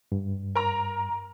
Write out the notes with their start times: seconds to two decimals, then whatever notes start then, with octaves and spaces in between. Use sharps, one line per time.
0.12 G2
0.55 A#4 A#5